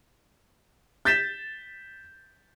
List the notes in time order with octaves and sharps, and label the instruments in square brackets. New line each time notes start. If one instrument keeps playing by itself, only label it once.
[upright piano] G6 A6 B6 E7